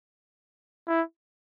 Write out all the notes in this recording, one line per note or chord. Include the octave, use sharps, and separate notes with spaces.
E4